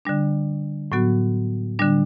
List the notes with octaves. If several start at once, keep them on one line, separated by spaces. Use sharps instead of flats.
D3 G3 D4
A2 F#3 B3 F#4
D3 G3 D4